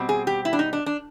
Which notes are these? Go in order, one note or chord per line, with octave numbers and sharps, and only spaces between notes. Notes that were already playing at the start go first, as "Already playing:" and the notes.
Already playing: B2 G3 C4
G#4
G4
E4
D4
D#4
D4
D4